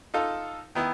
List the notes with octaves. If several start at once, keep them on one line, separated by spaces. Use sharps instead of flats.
D#4 F4 A4
D#3 B3 E4